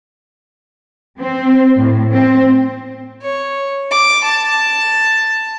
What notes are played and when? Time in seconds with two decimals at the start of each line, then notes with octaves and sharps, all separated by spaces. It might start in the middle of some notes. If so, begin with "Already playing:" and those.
1.19 C4
1.77 A2
2.13 C4
3.22 C#5
3.91 D6
4.24 A5